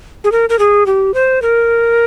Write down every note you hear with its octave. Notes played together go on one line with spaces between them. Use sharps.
G#4
A#4
A#4
G#4
G4
C5
A#4